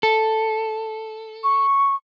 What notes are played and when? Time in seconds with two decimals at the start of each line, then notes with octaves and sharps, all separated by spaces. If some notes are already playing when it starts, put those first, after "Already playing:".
0.03 A4
1.44 C#6